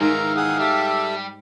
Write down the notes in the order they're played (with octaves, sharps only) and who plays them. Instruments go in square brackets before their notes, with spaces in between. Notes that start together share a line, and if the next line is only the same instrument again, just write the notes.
[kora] G#2 [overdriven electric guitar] D#3 E3 [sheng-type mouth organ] A#4 A#5 [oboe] F5
[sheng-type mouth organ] G#4 F#5 D#6
[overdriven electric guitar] G3 [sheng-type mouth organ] G4 A4 E5